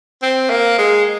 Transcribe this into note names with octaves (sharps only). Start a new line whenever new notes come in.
C4
A#3
G#3